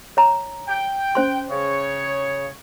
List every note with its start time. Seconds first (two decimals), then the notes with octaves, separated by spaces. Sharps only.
0.17 C#5 A#5
0.68 G5
1.15 C#4 C5 C6
1.50 C#3 C#5